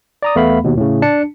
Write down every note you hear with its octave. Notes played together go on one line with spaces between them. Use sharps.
D5 A#5 D#6
E2 A3 B3 F5 B5
D#2 B2
A2 C#3
D4 A5 C#7